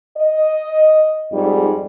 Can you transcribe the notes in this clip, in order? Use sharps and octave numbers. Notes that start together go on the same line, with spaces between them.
D#5
F2 G#2 G3 D#4